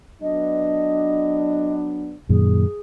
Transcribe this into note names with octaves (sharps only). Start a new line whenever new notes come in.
F#3 B3 D4 D#5
F#2 A#2 D#3 G#4